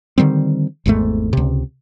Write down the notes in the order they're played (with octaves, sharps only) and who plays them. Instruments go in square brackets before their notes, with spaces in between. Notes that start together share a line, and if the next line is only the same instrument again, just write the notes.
[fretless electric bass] D3 D#3 G3 C4
G#1 E2 G#2 A3
C#2 C3